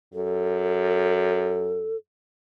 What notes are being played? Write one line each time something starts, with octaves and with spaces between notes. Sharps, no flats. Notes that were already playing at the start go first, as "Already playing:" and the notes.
F#2 A4